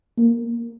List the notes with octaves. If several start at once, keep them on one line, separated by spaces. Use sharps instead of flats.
A#3